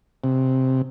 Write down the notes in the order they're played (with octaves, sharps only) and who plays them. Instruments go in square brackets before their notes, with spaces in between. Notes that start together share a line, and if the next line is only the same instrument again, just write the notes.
[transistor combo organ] C3